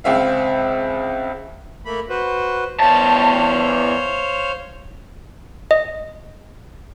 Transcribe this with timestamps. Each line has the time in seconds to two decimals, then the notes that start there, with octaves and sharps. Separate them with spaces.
0.04 C#2 C4 E5 F5
1.85 A3 A#3 B5
2.09 F#4 B4 C5
2.80 E2 C5 C#5 F5 A5
5.71 D#5